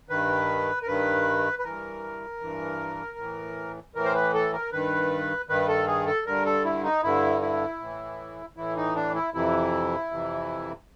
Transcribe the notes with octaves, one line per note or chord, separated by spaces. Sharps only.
G2 D#3 B4
A#4
G2 D#3 B4
B4
G2 E3 A#4
G2 E3
A2 E3
A2 E3 A#4
C5
B4
A4
A#4
G2 D#3 B4
G2 D#3 B4
A4
G#4
A4
G2 D3 A#4
A4
E4
D#4
G2 D3 E4
E4
A2 E3
A2 E3 E4
D#4
D4
E4
F2 C3 E3 E4
F2 C3 E3